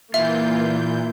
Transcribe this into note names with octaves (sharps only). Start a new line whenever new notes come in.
A#2 E3 A#3 E4 F4 E5 G6